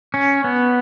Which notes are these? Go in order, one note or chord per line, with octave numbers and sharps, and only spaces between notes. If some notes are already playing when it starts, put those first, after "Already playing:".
C#4
B3